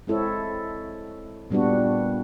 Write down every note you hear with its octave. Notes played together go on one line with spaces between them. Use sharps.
G#3 C4 E4 A4 C#5
A#2 G3 B3 D4 F#4